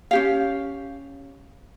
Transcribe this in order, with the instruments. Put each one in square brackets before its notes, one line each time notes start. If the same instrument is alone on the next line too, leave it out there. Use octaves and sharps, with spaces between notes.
[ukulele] C#4 G4 F5